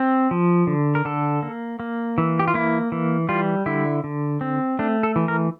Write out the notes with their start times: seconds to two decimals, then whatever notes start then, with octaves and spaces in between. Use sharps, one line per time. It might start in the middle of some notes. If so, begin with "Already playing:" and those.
Already playing: C4
0.31 F3
0.67 D3
0.95 A#4
1.05 D3 A4
1.43 A#3
1.80 A#3
2.18 E3
2.39 G4
2.48 F4
2.54 A#3 E4
2.92 E3
3.29 G3 F4
3.66 D3 E4
4.04 D3
4.41 C4
4.79 A3 D4
5.03 A4
5.16 E3
5.28 A#4